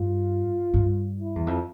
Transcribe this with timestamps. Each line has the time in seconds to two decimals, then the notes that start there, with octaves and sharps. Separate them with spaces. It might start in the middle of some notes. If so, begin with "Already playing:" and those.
Already playing: G2 F4
0.74 G2
1.20 E4
1.36 E2
1.47 F2